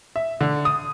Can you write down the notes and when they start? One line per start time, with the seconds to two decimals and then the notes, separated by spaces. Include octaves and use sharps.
0.16 E5
0.41 D3
0.65 D#6